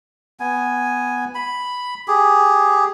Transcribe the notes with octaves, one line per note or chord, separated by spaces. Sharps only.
B3 G#5
B5
G4 G#4